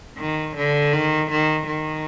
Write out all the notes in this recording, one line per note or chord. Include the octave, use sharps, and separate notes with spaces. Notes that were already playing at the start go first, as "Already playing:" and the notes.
D#3
D3
D#3
D#3
D#3